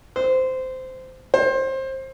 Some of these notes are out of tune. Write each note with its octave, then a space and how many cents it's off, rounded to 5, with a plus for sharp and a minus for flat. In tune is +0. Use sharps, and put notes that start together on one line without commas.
C5 -15
C5 +25